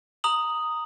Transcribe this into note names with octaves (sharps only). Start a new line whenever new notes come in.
A#5 D#6 F#7